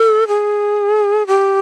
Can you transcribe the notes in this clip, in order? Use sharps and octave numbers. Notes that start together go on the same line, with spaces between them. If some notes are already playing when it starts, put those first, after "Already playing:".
Already playing: A4
G#4
G4